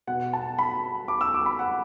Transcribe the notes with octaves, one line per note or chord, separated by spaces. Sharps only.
B2 B3 F#5
A5
B5
D6
E6
D6
B5
F#5